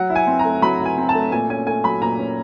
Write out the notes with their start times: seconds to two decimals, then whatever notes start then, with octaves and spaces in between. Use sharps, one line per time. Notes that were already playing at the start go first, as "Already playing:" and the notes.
Already playing: F#3 F#5
0.10 E4
0.15 G#5
0.27 C4
0.39 A#5
0.45 A3
0.62 F#3 B5
0.80 E4
0.85 G#5
0.98 C4
1.09 A5
1.15 A3
1.32 A#2 G#5
1.50 C#4 G#5
1.67 A3 G#5
1.84 F#3 B5
2.02 A#2 A#5
2.19 C#4